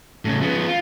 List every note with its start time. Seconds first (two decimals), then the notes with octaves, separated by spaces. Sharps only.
0.25 A2 C#3
0.41 F3 B3
0.68 F4